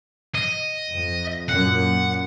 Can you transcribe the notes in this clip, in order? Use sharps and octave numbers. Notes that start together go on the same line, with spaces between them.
D#5
F2
F#2 A#2 F#5